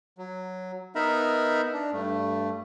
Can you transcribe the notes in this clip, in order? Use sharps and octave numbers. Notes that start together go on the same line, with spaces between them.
F#3
B3 D#4 A#4 E5 A#5 B5
D4
G2 A3